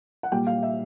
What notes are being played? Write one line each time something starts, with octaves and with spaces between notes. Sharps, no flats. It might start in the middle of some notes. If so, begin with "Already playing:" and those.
F#5
A#2 G3 G5
F5
E5